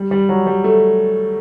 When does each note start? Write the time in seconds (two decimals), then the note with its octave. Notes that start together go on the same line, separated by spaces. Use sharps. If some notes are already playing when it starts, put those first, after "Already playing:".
Already playing: G3
0.11 G3
0.29 F#3
0.47 G3
0.64 A3